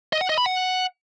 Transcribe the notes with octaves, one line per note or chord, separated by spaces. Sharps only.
D#5
F#5
D#5
B5
F#5